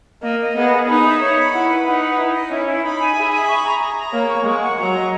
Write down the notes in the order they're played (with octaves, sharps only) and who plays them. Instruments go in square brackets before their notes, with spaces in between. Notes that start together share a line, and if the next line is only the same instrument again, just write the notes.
[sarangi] A#3 [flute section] D#5
[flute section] D#5
[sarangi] B3 [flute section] G#4
[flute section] G#4
[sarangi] D#4 [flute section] B5
[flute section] E5
C#5
B5
[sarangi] E4 [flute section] F#5
[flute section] B4
[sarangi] D#4 [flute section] F#5
[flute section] B4
E4
D#5
[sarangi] C#4 [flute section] E4
[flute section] E4
[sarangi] D#4 [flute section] B5
[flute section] G#5
[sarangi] G#4 [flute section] E5
[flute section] B5
C#6
A#5
A#5
A#5
[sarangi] A#3 [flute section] C#5
[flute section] C#6
[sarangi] G#3 [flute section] C#6
[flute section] F#5
[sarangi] F#3 [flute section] A#5
[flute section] D#5